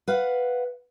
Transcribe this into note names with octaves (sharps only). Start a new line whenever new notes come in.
B4 F5 F#5